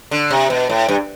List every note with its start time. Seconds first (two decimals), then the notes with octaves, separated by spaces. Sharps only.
0.11 D3
0.30 C3
0.50 B2
0.69 A2
0.88 G2